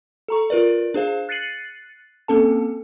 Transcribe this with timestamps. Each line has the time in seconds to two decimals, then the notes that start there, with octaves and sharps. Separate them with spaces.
0.28 A4 A#5 C#6
0.50 F4 A#4 B4 D5
0.94 D4 G#4 C5 F5
1.29 F#6 A6 C7 C#7 D#7 F#7
2.28 A#3 C4 C#4 A4 A5